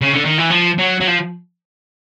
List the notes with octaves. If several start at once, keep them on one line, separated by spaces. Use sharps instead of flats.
C#3
D3
D#3
E3
F3
F#3
F#3
F3